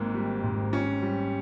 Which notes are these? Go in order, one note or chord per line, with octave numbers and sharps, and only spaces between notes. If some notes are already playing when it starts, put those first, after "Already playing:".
Already playing: G#1 G#2 A#3
G3
G#2
C#4
G3